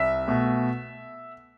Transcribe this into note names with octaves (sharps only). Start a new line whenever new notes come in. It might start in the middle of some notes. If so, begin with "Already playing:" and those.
Already playing: C2 E5
B2 A3